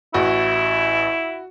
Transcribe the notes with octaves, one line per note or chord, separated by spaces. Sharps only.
A1 E4 F#4